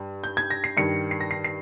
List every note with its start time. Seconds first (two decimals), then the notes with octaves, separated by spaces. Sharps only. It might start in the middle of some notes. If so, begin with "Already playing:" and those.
Already playing: G2
0.24 G6
0.37 G#6
0.50 A#6
0.64 C7
0.77 G2 D#3 C#7
1.11 C7
1.21 A#6
1.31 C7
1.44 C7